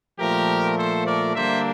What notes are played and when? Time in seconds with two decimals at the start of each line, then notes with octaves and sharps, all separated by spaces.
0.20 A#2 F3 A3 G4 A#4
0.77 A4 C5
1.07 A#4 D5
1.35 D3 G3 A#3 D4 C5 E5